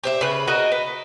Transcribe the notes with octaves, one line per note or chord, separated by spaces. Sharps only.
G4 C5 E5
C#3 B4
F#4 A#4 D#5 F#5
B4